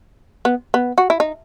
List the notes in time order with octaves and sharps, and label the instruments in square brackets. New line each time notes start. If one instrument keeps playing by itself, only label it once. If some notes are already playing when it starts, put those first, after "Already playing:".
[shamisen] B3
B3
F#4
E4
D#4